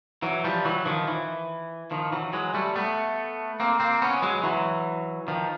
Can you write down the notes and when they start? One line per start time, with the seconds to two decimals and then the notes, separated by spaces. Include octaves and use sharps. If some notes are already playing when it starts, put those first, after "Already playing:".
0.22 E3 F#3
0.44 F3 G3
0.65 E3 F#3
0.86 D#3 F3
1.07 E3
1.91 D#3 F3
2.12 E3 F#3
2.33 F#3 G#3
2.54 G3 A3
2.76 A3 B3
3.60 A#3 C4
3.80 A#3 C4
4.02 B3 C#4
4.22 F#3 G#3
4.43 E3 F#3
5.28 D#3 F3